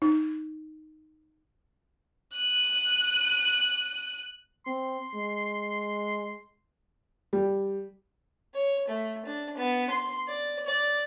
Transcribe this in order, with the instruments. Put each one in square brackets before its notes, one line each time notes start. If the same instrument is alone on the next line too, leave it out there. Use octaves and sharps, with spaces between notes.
[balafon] D#4
[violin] F#6 D#7
[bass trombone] C4 [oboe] C6
[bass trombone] G#3
[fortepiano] G3
[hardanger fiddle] C#5
A3
D4
B3
C6
D5
D5